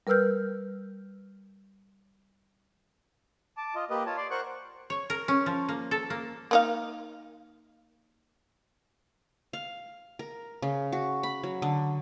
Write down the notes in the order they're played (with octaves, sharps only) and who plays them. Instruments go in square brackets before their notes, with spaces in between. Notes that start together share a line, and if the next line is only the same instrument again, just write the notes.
[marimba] G3 A#4 B4 E6 F6 G6
[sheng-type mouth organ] A5 D6
F4 D#5
A#3 G4 B4 D#5
F4 C#5 A5
D5 C6 D6
A#4 C5 F#5 C#6 F#6
[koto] C#5
A#4
C#4
F3
A#3
A4
A#3
[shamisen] A#3 D#4 F5
[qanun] F5
A#4
C#3
F#4
B5
F#3
D3